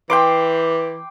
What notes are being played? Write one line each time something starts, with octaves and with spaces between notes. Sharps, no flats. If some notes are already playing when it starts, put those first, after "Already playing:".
E3 G5 C6 D6